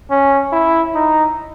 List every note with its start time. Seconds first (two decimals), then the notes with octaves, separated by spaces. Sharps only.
0.10 C#4
0.53 E4
0.94 D#4